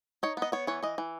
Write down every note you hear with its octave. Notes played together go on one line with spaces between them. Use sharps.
D#4 C#5
B3
D#5
B3 C#5
E3 C#5
E3 D#5
E3